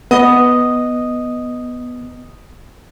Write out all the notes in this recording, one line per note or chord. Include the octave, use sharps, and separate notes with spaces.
B3 D#5